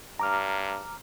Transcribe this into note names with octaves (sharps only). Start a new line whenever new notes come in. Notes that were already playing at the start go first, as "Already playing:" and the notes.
G2 A#5 D6 F6